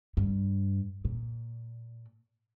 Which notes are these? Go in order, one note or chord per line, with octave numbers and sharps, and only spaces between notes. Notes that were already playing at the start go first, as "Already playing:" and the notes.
G2
A#2